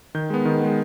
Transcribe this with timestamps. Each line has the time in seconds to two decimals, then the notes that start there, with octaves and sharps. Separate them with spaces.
0.15 D#3 G6
0.30 G#3 B3
0.45 D#3
0.60 G#3 B3